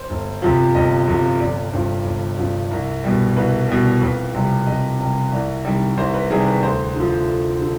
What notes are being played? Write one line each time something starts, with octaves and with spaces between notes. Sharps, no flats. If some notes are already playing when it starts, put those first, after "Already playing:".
Already playing: C5
G1
F2 C3 F3
G1 D#5
F2 C3 F3
G1 D5
G2 F3 C5
G1
G2 F3
C2
B2 G3
C2 B4
B2 G3
F2 B4
C3 G3
F2 D#5
C3 G3
C2 D5
C3 D#3 G3
C2 C5
B4
C3 D#3 G3 G#4
B4
D2 C5
D3 F3
D2
D3